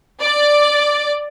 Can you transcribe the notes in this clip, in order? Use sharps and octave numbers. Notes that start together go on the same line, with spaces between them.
D5